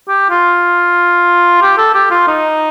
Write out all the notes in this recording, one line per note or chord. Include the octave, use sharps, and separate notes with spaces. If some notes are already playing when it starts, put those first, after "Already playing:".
G4
F4
G4
A4
G4
F4
D#4